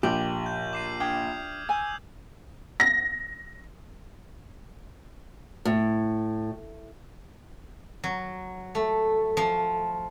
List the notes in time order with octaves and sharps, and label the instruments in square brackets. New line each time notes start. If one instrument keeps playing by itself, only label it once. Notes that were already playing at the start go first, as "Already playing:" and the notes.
[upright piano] A#1 [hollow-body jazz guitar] G4 [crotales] F#7
[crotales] G6
D6 C7 D#7
[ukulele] D4 E5 G5 [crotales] D#6 F6 G#6
[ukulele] G#5 [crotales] E6 G6
[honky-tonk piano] A#6
[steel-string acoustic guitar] A2
[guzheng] F#3
A3
F3